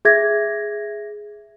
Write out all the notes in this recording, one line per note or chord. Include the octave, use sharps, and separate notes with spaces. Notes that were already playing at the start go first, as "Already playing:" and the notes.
G#4 E5 G#6 A#6